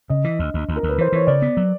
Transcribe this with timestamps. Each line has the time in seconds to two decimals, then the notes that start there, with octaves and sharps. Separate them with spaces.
0.09 C#3 D#5
0.24 E3
0.39 D2
0.54 D2
0.69 D2
0.76 A#4
0.83 D2
0.89 B4
0.98 E3 C5
1.12 E3 C#5
1.27 C#3 D5
1.42 B3
1.57 F#3